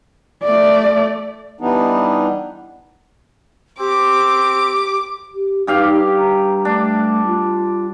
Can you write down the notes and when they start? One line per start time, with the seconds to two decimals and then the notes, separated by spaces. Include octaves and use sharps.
0.43 A3 D5
1.61 E3 G3 B3 D4 D#4
3.79 C4 G4 D6
5.34 G4
5.67 G2 D#4 G4 F5
6.18 A#5
6.65 A3 D4
7.27 F4